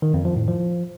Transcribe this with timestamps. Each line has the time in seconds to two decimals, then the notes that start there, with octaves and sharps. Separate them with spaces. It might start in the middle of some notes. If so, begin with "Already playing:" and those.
0.02 D#3
0.14 F2
0.25 F3
0.36 A2
0.48 F3